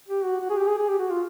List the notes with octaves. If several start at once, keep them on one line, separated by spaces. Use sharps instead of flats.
G4
F#4
F#4
G#4
G4
G#4
G#4
G4
F#4
F4